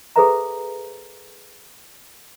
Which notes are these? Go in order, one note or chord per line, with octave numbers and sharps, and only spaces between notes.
G#4 A4 B4 C5 E5 A#5